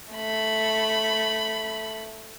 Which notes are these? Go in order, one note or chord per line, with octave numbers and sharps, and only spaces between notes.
A3 B5